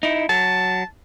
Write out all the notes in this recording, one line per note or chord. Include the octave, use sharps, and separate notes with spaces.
D#4 E4
F#3 A5